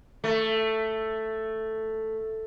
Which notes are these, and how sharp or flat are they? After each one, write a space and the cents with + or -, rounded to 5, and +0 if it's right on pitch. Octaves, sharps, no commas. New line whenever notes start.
A3 +5